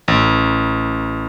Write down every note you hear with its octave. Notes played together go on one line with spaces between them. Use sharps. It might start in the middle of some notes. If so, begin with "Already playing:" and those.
A1